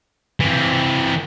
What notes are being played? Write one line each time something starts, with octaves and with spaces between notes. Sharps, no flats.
E3 C4